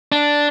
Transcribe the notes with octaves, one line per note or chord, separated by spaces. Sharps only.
D4